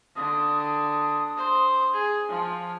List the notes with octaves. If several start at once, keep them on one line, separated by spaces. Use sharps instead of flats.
D3 D#6
C5
G#4
F3